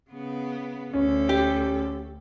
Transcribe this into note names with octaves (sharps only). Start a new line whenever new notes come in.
C#3 B3
D2 C#4 A4
G4